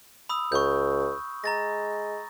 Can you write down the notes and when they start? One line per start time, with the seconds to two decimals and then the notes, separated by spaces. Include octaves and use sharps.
0.29 B5 D#6 E6
0.52 C#2 C#6 G6
1.44 G#3 A#5 A6 A#6